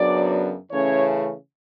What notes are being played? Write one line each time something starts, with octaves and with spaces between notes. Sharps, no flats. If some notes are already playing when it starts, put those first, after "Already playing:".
Already playing: F#2 C#3 F#3 B3 D4 D5
C#3 E3 A3 C#4 C#5